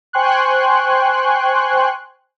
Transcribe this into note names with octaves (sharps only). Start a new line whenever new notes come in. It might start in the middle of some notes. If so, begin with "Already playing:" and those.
C5 G5 G#5 C6 C#6 F#6